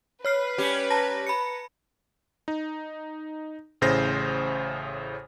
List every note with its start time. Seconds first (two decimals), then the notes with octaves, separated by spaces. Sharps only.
0.25 B4 C#5 F6 C7
0.58 G3 C#4 G4
0.90 A5 A#5 A#6
1.26 B5 C#7
2.48 D#4
3.81 A1 A2 C#3 C5 A#6